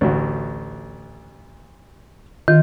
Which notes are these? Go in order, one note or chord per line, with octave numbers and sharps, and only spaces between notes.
A1 D2 F#4
D#3 F4